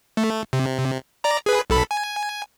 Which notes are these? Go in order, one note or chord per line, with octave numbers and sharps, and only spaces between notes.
A3
C3
D5 A#5
G#4 B4
B1 A4 B5
G#5